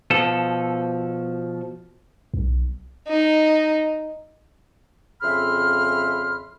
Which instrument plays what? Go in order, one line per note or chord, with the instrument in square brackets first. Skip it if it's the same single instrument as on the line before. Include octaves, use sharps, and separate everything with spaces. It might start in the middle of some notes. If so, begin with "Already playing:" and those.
[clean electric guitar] B2 F3 A4
[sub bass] B1
[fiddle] D#4
[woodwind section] F2 C#3 E5 B5 C6 F6